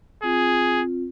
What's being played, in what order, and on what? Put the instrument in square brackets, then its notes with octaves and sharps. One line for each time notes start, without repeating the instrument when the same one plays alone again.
[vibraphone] C4 F4 [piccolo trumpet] G#4